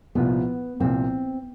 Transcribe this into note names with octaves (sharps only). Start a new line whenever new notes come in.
C2 A#2 F3 B3
C2 A#2 F3 C4